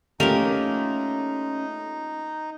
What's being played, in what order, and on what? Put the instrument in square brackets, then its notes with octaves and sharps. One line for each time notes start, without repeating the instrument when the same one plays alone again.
[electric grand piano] A3 F4 [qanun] A#3 G4 A#4 [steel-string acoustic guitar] C#4 D#5 [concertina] D#4